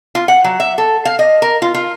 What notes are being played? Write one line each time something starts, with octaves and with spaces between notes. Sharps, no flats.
F4
F#5
F#3
E5
A4
F5
D#5
A#4
F4
F4